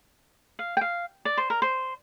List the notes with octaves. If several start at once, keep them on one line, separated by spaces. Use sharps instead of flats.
F5
G5
F5
D5
C5
A#4
C5